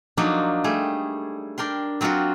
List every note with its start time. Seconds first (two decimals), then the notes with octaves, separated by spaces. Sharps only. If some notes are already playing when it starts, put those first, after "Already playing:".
0.17 F3 F#3 A#3 D4 D#4 F#4
0.64 G3 A3 G#4
1.58 D4 A#4 G5 C6
2.01 F#3 C4 D4 F4 F#4